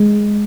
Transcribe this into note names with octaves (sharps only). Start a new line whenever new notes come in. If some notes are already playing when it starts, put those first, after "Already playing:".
Already playing: G#3